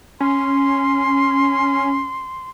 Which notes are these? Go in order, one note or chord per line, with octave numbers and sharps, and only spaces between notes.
C#4 C6